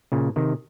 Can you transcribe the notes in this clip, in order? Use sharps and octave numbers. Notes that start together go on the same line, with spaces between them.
A#2 C#3
C3 D#3